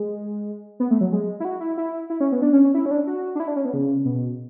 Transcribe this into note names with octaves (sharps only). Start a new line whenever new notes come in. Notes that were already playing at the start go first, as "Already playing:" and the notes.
Already playing: G#3
B3
A3
F#3
G#3
E4
F#4
E4
E4
E4
C#4
B3
D4
C#4
C#4
E4
C#4
D4
F#4
D4
E4
D4
C#4
B3
C#3
B2